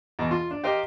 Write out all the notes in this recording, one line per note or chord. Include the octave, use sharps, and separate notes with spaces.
E2 B2
F4
D4
G4 A#4 C5 D#5 F5 G5